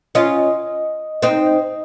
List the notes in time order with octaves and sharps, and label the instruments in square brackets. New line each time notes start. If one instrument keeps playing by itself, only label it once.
[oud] C#4 F4 [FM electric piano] D#5
[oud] C4 D#4 [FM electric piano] D#5